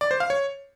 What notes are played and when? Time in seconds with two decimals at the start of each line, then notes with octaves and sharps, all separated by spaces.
0.01 D5
0.11 C5
0.20 F5
0.30 C#5